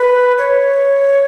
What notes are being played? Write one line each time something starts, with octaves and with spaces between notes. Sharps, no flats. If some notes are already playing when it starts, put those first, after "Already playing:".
Already playing: B4
C#5